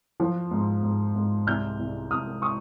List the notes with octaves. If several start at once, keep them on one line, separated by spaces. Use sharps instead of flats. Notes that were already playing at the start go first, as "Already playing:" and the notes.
F3
G#2
G#2
G#2
C2 F6 G6
C2
C2 D#6 F6
C#6 D#6